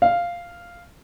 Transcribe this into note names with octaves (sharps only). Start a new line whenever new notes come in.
F5